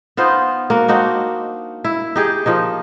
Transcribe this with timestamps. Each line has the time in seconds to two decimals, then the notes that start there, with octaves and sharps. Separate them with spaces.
0.17 B3 D#4 F4 C5
0.70 A#3 F#4
0.88 D4 D#4 F#4 C5
1.84 E4
2.16 D#4 G4 G#4
2.46 F3 A#3 D#4